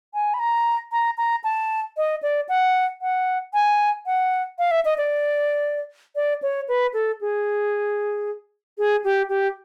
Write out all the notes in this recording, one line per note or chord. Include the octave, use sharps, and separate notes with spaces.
G#5
B5
A#5
A#5
A#5
A5
D#5
D5
F#5
F#5
G#5
F#5
F5
E5
D#5
D5
D5
C#5
B4
A4
G#4
G#4
G4
G4